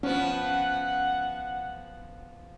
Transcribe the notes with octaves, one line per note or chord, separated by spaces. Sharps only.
F3 B3 C#4 F#5